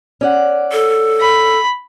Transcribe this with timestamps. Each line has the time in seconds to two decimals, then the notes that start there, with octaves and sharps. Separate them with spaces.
0.21 C#4 D5 F#5
0.72 A4
1.21 B5